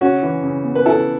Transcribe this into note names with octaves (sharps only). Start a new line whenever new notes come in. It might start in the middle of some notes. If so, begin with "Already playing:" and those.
C#3 C#4 F#4
E3
C#3
B3
B4
C#3 E4 A4